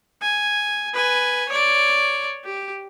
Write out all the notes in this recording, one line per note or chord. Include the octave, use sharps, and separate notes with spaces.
G#5
B4 G#5
C#5 D5
G4